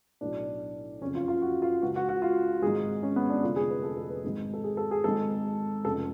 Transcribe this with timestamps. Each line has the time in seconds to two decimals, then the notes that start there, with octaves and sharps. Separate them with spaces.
0.21 B1 A2 D4
1.01 F#1 F2 C#3 C#4
1.15 F4
1.28 F4
1.42 F#4
1.62 F4
1.82 C#2 C#3 F#4
1.96 F#4
2.09 F#4
2.22 F4
2.62 G#1 G#2 G#4
3.03 C#4
3.16 B3
3.30 D4
3.43 F1 F2 D3 F4
3.56 G#4
3.70 B4
3.83 A4
3.97 A4
4.10 B4
4.24 G#1 G#2
4.53 A4
4.64 G#4
4.77 A4
4.91 G#4
5.04 G#1 G#2 A4
5.85 F1 F2 C#3 A4